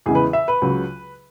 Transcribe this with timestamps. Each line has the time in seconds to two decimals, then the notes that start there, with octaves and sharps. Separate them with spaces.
0.06 E2 C#3 E3 G#3 G#4
0.15 B4
0.33 E5
0.48 B4
0.62 C#2 C#3 F#3